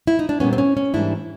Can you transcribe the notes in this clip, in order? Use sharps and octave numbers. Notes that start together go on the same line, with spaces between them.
E4
D#4
D4
A#2 G3 B3 C#4
C4
C#4
C#4
G#2 E3 G3 A#3 D4 E4